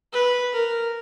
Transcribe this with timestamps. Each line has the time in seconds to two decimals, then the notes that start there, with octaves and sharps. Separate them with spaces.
0.13 B4
0.53 A#4